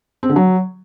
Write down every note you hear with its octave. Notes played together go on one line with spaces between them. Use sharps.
C4
D3
F#3